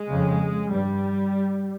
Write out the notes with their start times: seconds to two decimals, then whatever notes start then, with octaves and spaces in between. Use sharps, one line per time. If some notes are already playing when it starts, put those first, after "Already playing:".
Already playing: G#3
0.08 F2 C#3
0.71 G2 G3